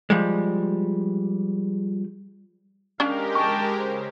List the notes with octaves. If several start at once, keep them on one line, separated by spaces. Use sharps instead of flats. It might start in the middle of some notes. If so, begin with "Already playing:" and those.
F3 G3 G#3
G#3 C#4 D4 G4 A#4 F5
G5 A5 C#6
C#3 C5